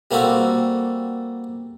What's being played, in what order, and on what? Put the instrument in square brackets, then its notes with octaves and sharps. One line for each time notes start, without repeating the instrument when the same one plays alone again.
[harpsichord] G3 A#3 C4 F#4 A4